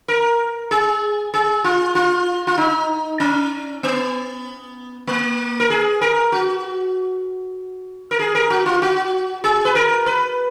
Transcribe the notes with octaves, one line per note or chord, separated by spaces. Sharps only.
A#4
G#4
G#4
F4
F4
F4
D#4
C#4
B3
A#3
A#4
G#4
A#4
F#4
A#4
G#4
A#4
F#4
F4
F#4
G#4
B4
A#4
B4